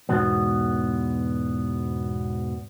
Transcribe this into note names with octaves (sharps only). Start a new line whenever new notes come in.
E2 G#2 B2 B3